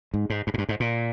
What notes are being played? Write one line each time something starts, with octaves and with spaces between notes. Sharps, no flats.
G#2
G#2
G2
G#2
G2
G#2
A#2